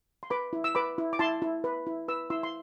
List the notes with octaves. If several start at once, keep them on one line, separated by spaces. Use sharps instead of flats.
C6
B4 B5 D6
E4
E6
B4 B5 D6
E4
D6
E4 A5 C6
E4
B4
E4
B4 E6
E4 C6 E6
C6